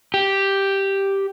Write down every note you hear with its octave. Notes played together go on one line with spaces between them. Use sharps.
G4